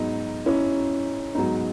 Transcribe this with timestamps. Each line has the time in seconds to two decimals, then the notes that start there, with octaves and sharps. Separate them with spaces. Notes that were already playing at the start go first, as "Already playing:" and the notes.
Already playing: G#2 F#3 B3 D#4
0.46 C#4 E4
1.35 G#2 F#3 B3 D#4